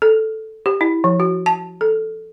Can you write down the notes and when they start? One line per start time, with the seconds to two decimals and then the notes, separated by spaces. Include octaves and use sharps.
0.02 A4
0.66 G4
0.81 E4
1.04 F3
1.20 F#4
1.46 A5
1.81 A4